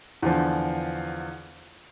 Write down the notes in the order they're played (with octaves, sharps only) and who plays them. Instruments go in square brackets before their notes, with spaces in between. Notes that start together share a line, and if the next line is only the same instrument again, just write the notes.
[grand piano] E2 D3 F3